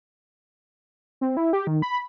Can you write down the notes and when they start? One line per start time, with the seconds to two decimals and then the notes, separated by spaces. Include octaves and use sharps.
1.21 C4
1.37 E4
1.53 G4
1.67 D#3
1.82 B5